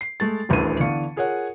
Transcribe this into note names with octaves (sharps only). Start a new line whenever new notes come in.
C7
G#3 A3 A6
D#1 A1 D2 A3 E4 D#7
D3 E3 B3 F5 C#6 C#7
F4 G#4 A#4 C#5 F#5